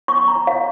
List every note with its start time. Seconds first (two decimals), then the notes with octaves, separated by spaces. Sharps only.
0.08 C#6
0.28 A#5
0.47 F5